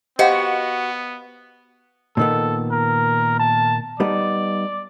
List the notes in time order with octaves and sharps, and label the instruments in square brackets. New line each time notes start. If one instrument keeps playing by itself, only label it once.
[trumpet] B3 [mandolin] F#4 [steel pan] G4 C5 [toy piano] D#5 F5 F#5
[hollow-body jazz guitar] A#2 D#3 B3 [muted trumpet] A4
[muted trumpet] A#4
A5
[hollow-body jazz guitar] G3 B3 D#4 [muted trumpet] D5